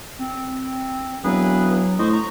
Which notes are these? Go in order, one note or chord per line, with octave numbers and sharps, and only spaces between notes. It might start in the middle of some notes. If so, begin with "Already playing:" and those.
C4
E1 F#3 G#4 B4
A2 C5 D#5 C#6
A#5